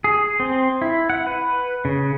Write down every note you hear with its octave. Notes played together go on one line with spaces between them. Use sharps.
G#4
C4
E4
F#5
B4
C#3